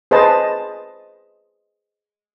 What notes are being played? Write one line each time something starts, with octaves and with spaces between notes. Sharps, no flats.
G#4 B4 C5 D#5 A5